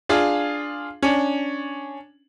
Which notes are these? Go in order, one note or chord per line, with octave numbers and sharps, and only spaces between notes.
D4 F4 G#4 F5
C#4 D4